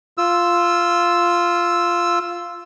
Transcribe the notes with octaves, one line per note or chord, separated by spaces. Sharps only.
F4 E6